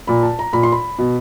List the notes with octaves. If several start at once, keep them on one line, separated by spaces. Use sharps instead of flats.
A#2 B5
A5
A#5
A#2 B5
C6
B5
B2